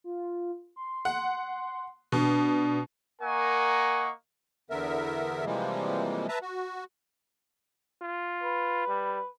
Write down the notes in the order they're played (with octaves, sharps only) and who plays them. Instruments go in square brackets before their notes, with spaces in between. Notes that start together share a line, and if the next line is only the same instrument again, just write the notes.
[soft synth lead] F4
C6
[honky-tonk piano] F#5
[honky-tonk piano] B2 [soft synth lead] D4
[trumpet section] A#3 A#4 D#5 F#5 G#5 C#6
[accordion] E2 D3 B3 A#4 E5
C3 E3 F3 G3 G#3 A#3
B4 E5 A5 A#5
F#4
[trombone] F4
[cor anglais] B4
[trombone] G3